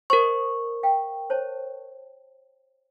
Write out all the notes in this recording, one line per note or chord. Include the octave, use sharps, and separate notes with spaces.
A#4 C5 D#5 C#6
F5 G5
C5 C#5 A5